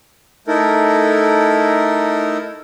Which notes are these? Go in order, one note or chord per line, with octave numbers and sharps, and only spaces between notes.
A3 D#4 E4 A4 A#4